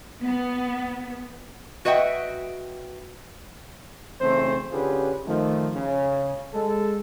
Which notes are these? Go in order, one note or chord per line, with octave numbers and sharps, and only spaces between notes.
B3
F#4 B4 D#5 E5 F#5 G5
B1 C#3 E3 A3 C4 C5
D3 C#4 F4 G4 G#4 B4
D#3 F3 A3
C#3
G#3 A4